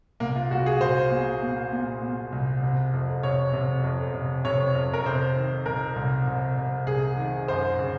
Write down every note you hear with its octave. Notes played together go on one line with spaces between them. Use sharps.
C2 A#3
F4
C2 F#4
G#4
C2 C5
A#2
A#2
A#2
A#2
C2
C3
F2
C3 C#5
C3
F2
C3
C3 C#5
F2
A#4
C3 C5
D#3
C2 A#4
C2
C2
C3
C2 G#4
D#3
F#2 C5
C#3